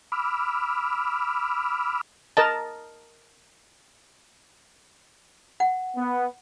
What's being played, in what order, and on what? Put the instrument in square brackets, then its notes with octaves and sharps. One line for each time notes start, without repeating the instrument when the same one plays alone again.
[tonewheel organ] B5 D6 E6 F6
[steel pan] A#4 D#5 A5
[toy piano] F#5
[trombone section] B3